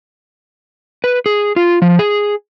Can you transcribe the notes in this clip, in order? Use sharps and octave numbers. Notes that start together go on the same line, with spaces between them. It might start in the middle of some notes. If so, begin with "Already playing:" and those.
B4
G#4
F4
F3
G#4